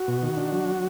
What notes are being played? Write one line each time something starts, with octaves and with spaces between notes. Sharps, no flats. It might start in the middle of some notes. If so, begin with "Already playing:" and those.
Already playing: F#4
B2
D#3
D4
F#3